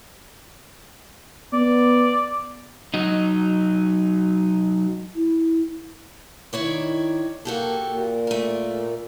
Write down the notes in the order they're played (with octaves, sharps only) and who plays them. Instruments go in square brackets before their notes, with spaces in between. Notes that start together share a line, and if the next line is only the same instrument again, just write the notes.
[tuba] B3 [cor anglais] D5
[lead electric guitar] F#3 D#4
[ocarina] E4
[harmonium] D#3 [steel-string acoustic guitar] E4 C#5 D5
[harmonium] A#3 [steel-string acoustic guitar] F#4 G4 A4
[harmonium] A#2
[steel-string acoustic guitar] A3 A#4